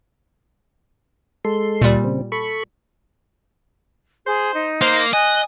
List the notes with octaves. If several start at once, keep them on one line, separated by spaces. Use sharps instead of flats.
G#3 A4 C6
D2 A#2 G3
C#3 C4
A4 B5 C#6
G#4 C5
D#4
A#3 C5
D#5 G#5 F#6